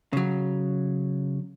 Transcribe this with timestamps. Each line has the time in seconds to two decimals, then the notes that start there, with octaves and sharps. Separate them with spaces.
0.13 C#3 F#3